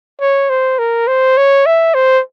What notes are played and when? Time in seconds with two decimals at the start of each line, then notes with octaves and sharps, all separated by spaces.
0.21 C#5
0.49 C5
0.79 A#4
1.08 C5
1.37 C#5
1.66 E5
1.95 C5